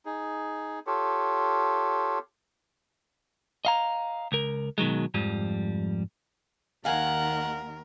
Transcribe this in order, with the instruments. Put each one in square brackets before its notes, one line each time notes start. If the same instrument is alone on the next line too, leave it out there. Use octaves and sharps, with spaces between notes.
[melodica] D#4 G#4
F4 G4 A4 C#5
[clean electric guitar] D#5 F5 A#5
C#2 A#4
B2 D#3 F#3 G#3
F2 G#2 F3 G3
[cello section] D#2 D#3 [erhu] A#4 [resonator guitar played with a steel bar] F5 G#5 [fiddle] F#5